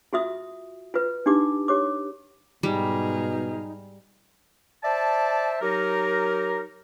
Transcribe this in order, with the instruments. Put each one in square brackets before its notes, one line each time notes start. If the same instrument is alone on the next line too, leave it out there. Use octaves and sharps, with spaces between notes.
[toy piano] F4 F#4 E5 D#6
F4 B4
D4 D#4 G4 D6
G4 C#5 D6
[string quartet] G#2 G#4 F6 [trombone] B2 [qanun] G3 [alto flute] D#4
[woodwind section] C5 D5 E5 A5
F#3 D#4 G4 A#4